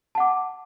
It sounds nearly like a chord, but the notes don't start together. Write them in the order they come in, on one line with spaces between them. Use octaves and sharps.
A5 F#5 D6